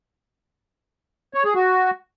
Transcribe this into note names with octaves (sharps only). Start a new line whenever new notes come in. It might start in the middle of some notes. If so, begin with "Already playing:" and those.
C#5
G#4
F#4